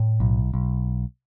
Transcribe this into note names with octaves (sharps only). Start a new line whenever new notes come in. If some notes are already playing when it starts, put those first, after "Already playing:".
Already playing: A2
B1
B1